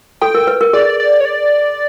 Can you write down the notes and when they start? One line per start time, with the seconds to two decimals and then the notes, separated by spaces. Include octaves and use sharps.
0.21 A4 G5
0.35 A#4
0.47 B4
0.61 A#4
0.73 G#4 D5
1.00 D5
1.21 C#5
1.25 D5